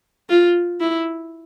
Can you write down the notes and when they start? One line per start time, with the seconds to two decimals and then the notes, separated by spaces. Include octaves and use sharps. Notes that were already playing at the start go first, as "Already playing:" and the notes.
0.30 F4
0.80 E4